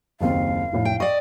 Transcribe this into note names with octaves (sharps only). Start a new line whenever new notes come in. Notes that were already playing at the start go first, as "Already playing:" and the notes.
F#1 D#2 C4 F5
F1 A2
G5
D5 D#5 C#6